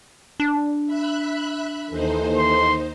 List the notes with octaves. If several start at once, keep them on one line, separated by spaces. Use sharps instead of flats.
D4
E5 B5 F#6
D#2 E3 A#3 D#4 A4 C5
C6